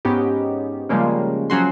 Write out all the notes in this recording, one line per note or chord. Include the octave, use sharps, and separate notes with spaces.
G#2 B3 C#4 D#4 G4
C#3 F3 G3 G#3 A#3 C#4
F3 F#3 C#4 F#4 C6